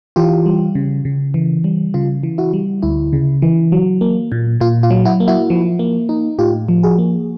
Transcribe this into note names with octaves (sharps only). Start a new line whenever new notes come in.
E3 F4 G4
G3
C#3
C#3
E3
G3
C#3 F4
E3
E4 F#4
G3
D2 E4
C#3
E3
F#3
A#3
A#2
A#2 F4
F4
F#3
E4 F#4
A#3
E4 F#4
F3
A#3
D#4
A2 F4 G4
F3
F#4 G#4
A#3